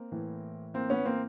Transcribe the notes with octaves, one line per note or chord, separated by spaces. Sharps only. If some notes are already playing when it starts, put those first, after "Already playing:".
Already playing: A#3 C4
A2 E3
A#3 C4
B3 C#4
A#3 C4